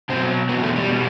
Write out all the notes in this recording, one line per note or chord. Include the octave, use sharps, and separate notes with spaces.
B2 F#3 C4
E2 B2 F#3 B3
A3
G3
B2 G3